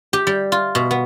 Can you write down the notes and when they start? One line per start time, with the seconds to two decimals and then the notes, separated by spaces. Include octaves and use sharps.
0.13 G4
0.27 G3
0.52 F4
0.75 B2
0.91 B3